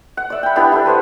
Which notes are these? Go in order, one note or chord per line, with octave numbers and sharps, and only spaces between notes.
F#5
D5 E5
G5 B5
B3 D4 E4 G4
E4 A4 B4 E5
B4 C5 E5 F#5